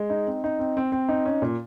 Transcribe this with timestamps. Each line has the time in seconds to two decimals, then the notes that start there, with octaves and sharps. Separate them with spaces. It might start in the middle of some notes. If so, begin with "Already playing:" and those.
Already playing: G#3
0.10 D#4
0.27 C4
0.44 D#4
0.59 C4
0.77 C4
0.92 C4
1.09 D#4
1.26 C#4
1.42 A#2